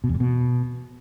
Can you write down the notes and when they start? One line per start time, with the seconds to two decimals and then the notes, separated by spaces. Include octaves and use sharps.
0.04 B2
0.09 E2
0.15 A#2
0.20 B2